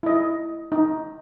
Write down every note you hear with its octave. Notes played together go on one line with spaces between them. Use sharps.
E4 D#5
D#4